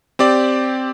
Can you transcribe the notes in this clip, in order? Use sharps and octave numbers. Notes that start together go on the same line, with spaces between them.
C4 G4 D5